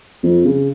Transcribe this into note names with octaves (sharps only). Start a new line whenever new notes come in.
F2
C#3